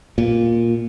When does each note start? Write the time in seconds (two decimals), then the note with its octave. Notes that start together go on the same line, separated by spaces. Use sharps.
0.18 A#2